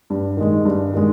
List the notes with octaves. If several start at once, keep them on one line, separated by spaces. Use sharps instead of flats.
G2
D#3 G#3
G2
D#3 G#3